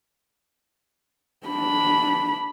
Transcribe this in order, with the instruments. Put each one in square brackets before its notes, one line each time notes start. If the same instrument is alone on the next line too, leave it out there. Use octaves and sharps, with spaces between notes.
[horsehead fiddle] D4 B5